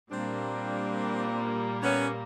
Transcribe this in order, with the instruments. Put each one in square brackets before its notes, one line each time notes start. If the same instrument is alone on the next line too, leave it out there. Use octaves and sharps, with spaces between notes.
[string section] A#2 G3 A#3 [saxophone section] C4 D4
[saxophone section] B3 C#4